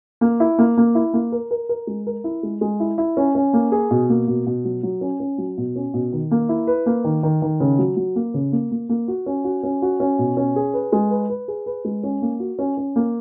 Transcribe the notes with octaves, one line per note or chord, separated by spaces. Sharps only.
A#3
E4
A#3
A#3
E4
A#3
A#4
A#4
A#4
G#3
A#4
E4
G#3
G#3
E4
E4
C#4
C#4
A#3
G#4
B2
A#3
B2
B2
F#3
F#3
C#4
C#4
F#3
B2
C#4
B2
D#3
A#3
E4
B4
A#3
D#3
D#3
D#3
C#3
F#3
F#3
A#3
C#3
A#3
A#3
A#3
F#4
C#4
F#4
C#4
F#4
C#4
B2
C#4
G#4
B4
G#3
B4
B4
G#4
B4
G#3
C#4
A#3
F#4
C#4
C#4
A#3